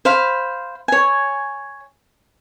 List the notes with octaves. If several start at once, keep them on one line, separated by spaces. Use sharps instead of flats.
C5 F5 B5
C#5 G#5